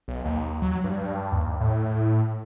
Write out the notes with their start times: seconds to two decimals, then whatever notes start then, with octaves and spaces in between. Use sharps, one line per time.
0.08 B1
0.25 D#2
0.62 F#3
0.84 G2
1.03 G2
1.32 D#2
1.60 A2